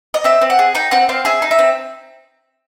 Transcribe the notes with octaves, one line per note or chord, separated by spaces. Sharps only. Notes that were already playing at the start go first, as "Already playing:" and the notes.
D#5
C4 E5
C4
F#5
G#4
D#4 G5
C4 F#5
C4 F5
G#4 E5
D#4
E5
C4